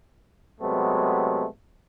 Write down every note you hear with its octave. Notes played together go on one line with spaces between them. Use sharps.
C3 F#3 G#3 A3 B3